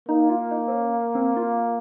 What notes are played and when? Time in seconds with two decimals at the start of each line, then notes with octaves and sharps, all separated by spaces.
0.09 A#3 D#4
0.30 F4
0.51 D#4
0.68 C4
0.72 C#4
1.15 C4
1.37 F4